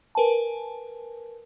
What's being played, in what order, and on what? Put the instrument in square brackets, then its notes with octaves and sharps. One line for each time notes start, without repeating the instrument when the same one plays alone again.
[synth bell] A#4 B4 G#5 A5